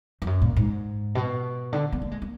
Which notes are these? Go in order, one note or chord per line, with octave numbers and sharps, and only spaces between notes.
F2
F#2
A#2
G#2
B2
D3
B3
A#3
G#3
A#3